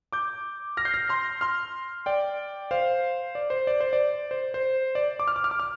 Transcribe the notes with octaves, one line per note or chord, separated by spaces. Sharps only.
D6 G6
F6 A#6
G6 C7
F6 A#6
C6 F6
C6 F6
D5 G5
C5 F5
D5
C5
D5
C5
D5
C5
C5
D5
D6
F6
D6
F6
D6
F6